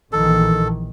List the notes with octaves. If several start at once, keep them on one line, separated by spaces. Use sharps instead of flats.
A#1 D#3 E3 A4